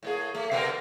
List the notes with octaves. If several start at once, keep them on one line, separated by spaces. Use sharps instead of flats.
A2 A#3 G#4
A3
B2 B3 A#4